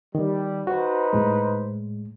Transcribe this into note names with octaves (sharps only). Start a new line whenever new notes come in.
D#3 G3
D#4 F#4 B4 C5
A2 G#3